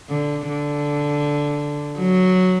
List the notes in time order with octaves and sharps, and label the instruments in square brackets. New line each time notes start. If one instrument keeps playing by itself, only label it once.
[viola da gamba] D3
D3
F#3